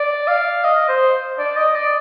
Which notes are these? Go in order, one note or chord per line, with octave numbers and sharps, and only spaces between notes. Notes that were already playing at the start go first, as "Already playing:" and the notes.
Already playing: D5
F5
D#5
C5
D5
D#5
D5